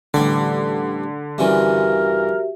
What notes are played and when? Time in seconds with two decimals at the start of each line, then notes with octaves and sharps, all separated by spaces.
0.14 A1 D3 G3 D5
1.38 G2 C#3 E3 F#4 G4 A#4 E5